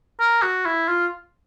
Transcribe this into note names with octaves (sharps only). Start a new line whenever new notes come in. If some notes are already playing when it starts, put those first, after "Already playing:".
A#4
F#4
E4
F4